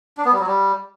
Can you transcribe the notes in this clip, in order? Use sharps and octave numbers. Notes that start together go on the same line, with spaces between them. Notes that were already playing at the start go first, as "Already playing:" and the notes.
D4
B3
G3
F#3
G3